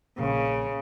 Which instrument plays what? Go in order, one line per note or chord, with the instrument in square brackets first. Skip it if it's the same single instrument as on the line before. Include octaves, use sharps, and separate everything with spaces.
[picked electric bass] A#1 A#2 [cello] C#3